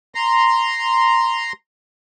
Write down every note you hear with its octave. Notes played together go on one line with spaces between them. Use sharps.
A#5 C6